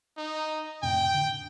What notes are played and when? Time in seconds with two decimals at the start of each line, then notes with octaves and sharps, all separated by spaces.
0.17 D#4
0.83 F2 A2 C3 G5
1.14 D3